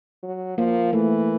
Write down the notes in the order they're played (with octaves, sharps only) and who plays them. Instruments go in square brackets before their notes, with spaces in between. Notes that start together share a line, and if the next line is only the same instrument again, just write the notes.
[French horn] F#3
[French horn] F3 [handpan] A#3
[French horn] E3 [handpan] A3